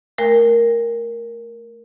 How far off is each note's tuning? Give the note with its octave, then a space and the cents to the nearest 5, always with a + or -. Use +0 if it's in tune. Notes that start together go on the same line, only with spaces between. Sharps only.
A3 +0 A#4 +0 G5 +45